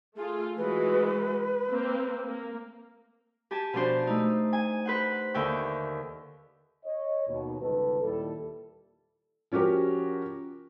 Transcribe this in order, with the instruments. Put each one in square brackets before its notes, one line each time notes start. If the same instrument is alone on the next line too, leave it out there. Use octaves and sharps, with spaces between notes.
[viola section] A3 F4 [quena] G#4
[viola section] E3 G#3 F#4 [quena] B4
[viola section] A#3 C4
A#3
[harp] G4 G#5 A5
B2 F3 D4 C5
A3 D#4
G#5
B4 C5 F#5
D#2 D3 E5 G5 C#6
[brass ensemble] C#5 D#5
D#2 B2
G1 C#2 D#3 A4 B4
D#2 A#2 G3 E4 A4
[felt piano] F3 C#4 F#4 G4 A#4